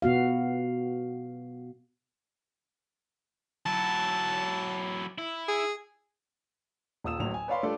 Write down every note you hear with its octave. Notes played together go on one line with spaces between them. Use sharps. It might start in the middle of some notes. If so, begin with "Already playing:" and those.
B2 B3 F#4 F5
F#3 E4 A5
E4
G#4
D#1 F4 D#6 E6 E7
A1 D2 F#3 F7
G#5
B4 C#5 D5 F5 B5 C6
G3 A3 D4 F4 A4 D5